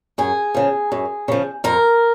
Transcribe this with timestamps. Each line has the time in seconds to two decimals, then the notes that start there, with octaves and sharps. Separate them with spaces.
0.18 F#2 G#4
0.54 C#3 F3
0.92 F#2
1.28 C#3 F3
1.64 F2 A#4